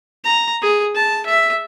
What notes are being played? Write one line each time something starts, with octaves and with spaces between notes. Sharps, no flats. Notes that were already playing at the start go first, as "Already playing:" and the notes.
A#5
G#4
A5
E5